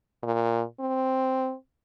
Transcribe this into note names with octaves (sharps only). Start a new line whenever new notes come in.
A#2
C4